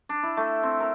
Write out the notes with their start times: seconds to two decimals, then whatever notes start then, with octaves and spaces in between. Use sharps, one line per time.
0.09 D4
0.23 E4
0.37 A3
0.63 C4
0.80 A#4